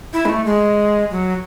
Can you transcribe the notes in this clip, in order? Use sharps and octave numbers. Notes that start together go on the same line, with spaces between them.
E4
G#3
A3
G#3
F#3